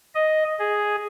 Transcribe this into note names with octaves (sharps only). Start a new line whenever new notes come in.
D#5
G#4